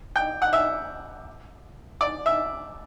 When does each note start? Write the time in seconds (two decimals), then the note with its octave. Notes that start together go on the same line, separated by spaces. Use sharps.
0.16 G5
0.42 F#5
0.53 E5
2.01 D5
2.26 E5